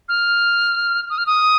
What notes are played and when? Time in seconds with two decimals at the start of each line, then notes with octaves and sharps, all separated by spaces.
0.09 F6
1.10 D#6
1.18 F6
1.26 D#6